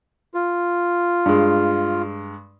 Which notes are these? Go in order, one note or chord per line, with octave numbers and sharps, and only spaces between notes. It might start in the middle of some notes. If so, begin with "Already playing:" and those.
F4
G2 G#3